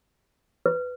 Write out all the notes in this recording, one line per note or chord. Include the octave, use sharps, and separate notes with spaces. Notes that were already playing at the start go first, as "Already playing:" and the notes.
B4